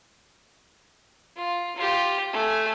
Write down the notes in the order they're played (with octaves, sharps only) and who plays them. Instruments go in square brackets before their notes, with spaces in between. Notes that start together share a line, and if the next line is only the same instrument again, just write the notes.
[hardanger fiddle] F4
F4 G4
A3 G#5